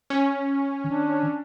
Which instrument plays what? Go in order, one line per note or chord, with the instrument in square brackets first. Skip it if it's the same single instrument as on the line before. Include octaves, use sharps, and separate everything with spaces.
[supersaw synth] C#4
[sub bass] D#3 [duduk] D4